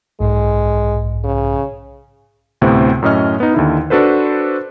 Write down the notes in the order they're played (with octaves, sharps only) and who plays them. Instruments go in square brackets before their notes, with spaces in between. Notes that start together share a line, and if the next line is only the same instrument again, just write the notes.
[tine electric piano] B1 G#2 [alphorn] G#3
[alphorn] C#3
[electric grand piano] D2 A2 C3 B3 C4
F#2 A2 C#4 D#5 F6
B3 D#4
D#2 D3 E4
D4 F#4 A4 B4 C5